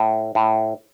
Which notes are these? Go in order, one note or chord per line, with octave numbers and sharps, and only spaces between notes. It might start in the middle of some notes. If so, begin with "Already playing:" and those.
Already playing: A2
A2